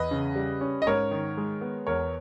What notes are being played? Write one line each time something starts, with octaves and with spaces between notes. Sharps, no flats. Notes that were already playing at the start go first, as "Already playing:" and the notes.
Already playing: E2 B4 D#5
C#3
G3
C#4
D#5
G#2 A#4 C#5
D#3
G#3
B3
E2 A#4 C#5